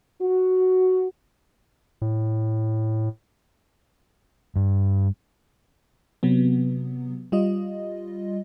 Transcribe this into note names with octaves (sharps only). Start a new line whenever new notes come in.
F#4
A2
G2
C3 F#3 B3
G3 F4 D#5